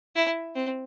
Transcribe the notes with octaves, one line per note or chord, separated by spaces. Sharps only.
E4
C4